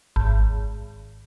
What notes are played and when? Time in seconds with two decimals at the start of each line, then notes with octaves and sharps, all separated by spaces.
0.16 G#1